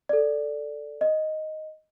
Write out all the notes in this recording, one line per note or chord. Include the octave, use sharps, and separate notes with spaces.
A4 D5
D#5